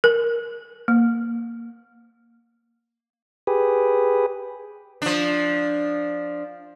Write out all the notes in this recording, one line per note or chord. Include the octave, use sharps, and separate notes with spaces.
A#4
A#3
G4 G#4 B4
F3 D4